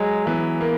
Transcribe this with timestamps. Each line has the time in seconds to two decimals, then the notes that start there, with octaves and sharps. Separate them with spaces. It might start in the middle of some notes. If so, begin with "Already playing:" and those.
Already playing: F#3 G#3
0.27 E3 B3
0.61 A#3